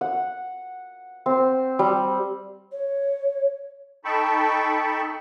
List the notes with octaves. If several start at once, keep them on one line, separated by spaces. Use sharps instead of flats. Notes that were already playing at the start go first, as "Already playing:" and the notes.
F#5
C4
G3
C#5
D#4 A4 G5 A5 B5 C#6